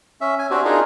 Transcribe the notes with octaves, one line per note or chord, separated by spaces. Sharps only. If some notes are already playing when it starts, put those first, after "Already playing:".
C#4 E5
G#5
C4 D4 F#4 G4
D4 D#4 F4 G#4 A#4